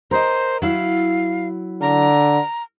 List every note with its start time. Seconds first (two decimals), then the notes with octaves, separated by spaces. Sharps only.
0.11 A#4 C5 D#5
0.62 F#3 E4 F5
1.81 D3 A#5